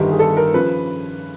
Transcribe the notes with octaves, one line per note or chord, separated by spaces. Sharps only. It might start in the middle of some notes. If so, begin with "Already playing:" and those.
Already playing: G1 G2 D#3 G4
G#4
A4
A#4
C#3 F3 B4